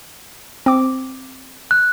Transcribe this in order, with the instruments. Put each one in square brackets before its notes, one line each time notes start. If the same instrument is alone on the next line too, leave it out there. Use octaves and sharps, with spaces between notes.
[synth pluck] C4 D6
[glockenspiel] F#6